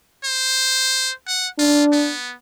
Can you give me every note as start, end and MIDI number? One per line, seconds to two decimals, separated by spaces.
0.24 1.12 72
1.27 1.47 78
1.59 2.13 62
1.59 1.83 65
1.92 2.34 59